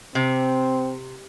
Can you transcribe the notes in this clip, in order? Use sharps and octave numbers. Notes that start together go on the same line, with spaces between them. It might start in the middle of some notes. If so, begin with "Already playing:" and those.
C3 C4